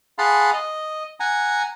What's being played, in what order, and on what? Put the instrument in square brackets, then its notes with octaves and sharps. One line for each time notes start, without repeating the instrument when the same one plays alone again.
[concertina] G#4 F5 F#5 A5 B5 C6
D#5
F#5 G#5 A#5